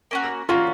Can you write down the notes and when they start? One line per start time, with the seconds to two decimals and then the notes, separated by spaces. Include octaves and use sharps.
0.11 A#3 C#4 F#4
0.49 A#3 C#4 F4 F#4